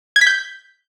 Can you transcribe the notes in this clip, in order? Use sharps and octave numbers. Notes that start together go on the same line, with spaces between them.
G#6
B6
G6